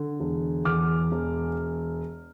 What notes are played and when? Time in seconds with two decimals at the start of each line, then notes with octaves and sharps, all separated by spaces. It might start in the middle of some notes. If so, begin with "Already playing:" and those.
Already playing: D3
0.20 E1
0.65 E2 D6 F6
1.12 E1